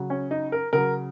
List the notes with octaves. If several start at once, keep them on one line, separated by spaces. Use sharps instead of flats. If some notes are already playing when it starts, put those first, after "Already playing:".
Already playing: C#3 F#3
C#4
D#4
A#4
C#3 F#3 A#4